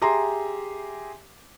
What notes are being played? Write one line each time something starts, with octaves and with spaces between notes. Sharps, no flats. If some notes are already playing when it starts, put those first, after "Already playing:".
G4 G#4 E5 A#5 C6